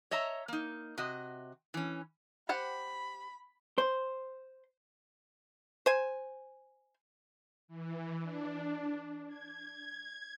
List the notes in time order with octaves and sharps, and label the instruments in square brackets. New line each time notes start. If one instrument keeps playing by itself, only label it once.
[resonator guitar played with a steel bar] C#5 D#5 E5 A#5
A#3 D#4
C3 F#4 D#5
E3 C#4
[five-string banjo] G4 C5 F#5 [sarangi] B5
[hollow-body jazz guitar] C5
[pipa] C5 G#5
[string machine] E3
D4
G#6